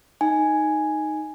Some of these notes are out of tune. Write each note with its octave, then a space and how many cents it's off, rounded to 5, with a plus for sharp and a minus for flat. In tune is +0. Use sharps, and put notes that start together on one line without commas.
D#4 +0 G#5 +0